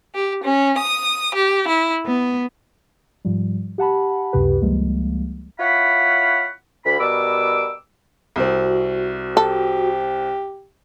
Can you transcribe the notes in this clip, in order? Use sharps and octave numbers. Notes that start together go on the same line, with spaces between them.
G4
C#4
D#6
G4
E4
B3
G#2 F3 G3
G4 F#5 A5 B5
C#2 F#2 C3 G4 B4
C#2 F3 G3 G#3 A#3
E4 F4 C#5 F5 F#5 B5
D2 B5
B2 G3 A#4 D6 E6
C2 C4 F#4
G4 A4